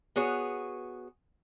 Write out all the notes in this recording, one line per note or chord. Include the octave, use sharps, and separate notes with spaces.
B3 F#4 G#4 C#5